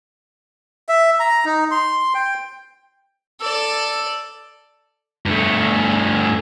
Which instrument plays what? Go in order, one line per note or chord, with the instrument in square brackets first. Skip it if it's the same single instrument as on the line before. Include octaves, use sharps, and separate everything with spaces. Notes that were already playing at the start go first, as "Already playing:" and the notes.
[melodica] E5
A#5
D#4
C6
G5
[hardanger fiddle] A4 D5 [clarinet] E6
[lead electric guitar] G2 A3